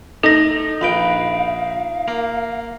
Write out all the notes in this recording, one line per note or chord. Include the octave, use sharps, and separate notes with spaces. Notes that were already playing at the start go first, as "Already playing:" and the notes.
A3 D#4 A4 A#6
A#1 B4 F5 G5
A#3